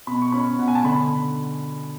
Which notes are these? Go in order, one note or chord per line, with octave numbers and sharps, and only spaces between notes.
B2 B5
C#6
C#4 B5
B2 F#5
G#5
A5
D3 B5